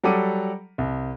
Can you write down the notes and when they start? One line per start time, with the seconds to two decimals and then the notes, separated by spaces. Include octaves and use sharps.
0.03 F#3 G3 A4 F#5 D6 D#7
0.78 C2